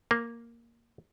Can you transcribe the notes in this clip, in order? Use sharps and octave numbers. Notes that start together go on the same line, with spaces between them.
A#3